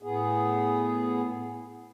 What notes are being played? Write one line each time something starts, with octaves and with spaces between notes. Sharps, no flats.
A2 B3 G#4